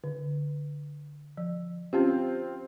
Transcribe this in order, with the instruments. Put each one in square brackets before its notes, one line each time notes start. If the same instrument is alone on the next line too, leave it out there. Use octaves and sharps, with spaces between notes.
[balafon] D3
F3
[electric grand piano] C4 F4 C5 [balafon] C#4 G4